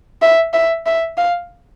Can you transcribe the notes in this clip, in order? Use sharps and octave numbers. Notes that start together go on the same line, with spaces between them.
E5
E5
E5
F5